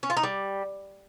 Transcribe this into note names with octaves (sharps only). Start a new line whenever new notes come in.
C#4
F4
D#4
G3